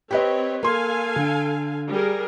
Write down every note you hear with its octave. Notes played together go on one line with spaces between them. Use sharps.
C4 G4 B4 C#5 D#5
A#3 A4 F5 G#5 C6
D3
G3 G#4 A#4